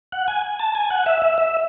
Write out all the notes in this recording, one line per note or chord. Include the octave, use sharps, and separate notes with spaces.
F#5
G#5
A5
G#5
F#5
E5
E5
E5